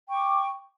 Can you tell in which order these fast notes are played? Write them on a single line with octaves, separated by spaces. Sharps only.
G5 C#6 D6